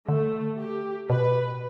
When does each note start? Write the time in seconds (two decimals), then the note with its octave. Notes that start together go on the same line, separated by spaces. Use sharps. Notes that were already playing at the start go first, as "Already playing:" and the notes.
0.08 D3 A3
0.60 G4
1.10 B2 B4